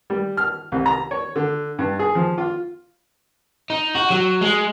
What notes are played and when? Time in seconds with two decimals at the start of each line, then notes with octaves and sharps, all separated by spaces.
0.10 G3
0.37 F6
0.72 C2
0.86 A#5
1.11 C#5
1.36 D3
1.79 G2
1.99 G#4
2.15 F3
2.38 F4
3.70 D#4
3.95 F#4
4.10 F#3
4.41 G#3